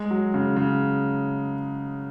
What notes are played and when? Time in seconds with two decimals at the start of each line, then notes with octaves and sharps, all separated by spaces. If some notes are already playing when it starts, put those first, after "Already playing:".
Already playing: G#3
0.10 F#3
0.34 C#3
0.56 C#3